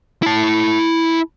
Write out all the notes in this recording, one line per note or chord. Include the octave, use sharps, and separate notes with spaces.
E4 A5